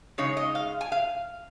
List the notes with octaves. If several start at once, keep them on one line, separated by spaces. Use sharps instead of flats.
C#3 G#3 D#4 C#5
D#5
F5
G#5
F5